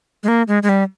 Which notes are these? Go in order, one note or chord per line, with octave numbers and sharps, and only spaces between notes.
G#3
A#3
G#3
G#3
G3